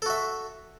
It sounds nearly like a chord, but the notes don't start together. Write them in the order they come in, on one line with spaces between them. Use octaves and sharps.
A4 F#4 E5